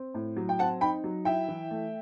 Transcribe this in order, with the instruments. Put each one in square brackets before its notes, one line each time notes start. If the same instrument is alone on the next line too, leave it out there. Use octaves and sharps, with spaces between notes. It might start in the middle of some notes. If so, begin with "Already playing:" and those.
Already playing: [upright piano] C4
A2
F#3
G5
C4 F#5 A5
D#4 G5 B5
F#3
E4 E5 G5
E3
A3